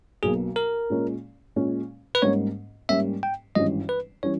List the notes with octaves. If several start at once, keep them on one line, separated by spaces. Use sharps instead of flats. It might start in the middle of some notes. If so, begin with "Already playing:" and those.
B1 B2 A#3 G#4
A#4
A#2 G#3 C#4
A#2 G#3 C#4
B4
G#2 G3 A#3 C#4 C#5
G#2 G3 A#3 C#4 E5
G5
G#1 G2 E3 G3 C#4 D#5
B4
E3 G3 C#4 C#5